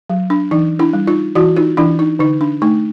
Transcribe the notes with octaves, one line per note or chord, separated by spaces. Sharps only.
F#3
D4
E3 D#4
D4 E4
G3
D#4 F4
E3 E4 F#4
D#4 F4
E3 D4 E4
D#4
D3 D#4
D4
A3 D#4